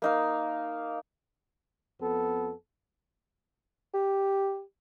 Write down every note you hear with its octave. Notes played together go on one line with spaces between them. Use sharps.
A#3 D#4 F5
F2 B3 A4
G4